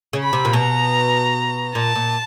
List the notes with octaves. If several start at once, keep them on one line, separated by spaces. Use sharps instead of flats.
C#3
B5
C3
A#2
B2 A#5
A#2 A5
A#2